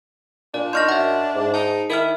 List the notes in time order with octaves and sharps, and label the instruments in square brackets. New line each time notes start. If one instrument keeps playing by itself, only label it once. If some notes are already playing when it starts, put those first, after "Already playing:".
[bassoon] A#2 [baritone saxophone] D4 [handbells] D5
[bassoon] D#4 [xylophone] D#5 F6 G6 [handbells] C6 C#6 A#6
[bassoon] F#2 [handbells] E5 F#5
[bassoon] G#2
[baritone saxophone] D#4 [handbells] A5
[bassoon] D#3 [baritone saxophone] E4 [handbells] A#4 E5 F6